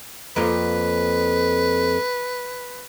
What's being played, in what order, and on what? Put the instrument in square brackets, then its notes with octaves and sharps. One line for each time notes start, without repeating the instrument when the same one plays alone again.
[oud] F2 A#3 F4 [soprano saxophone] B4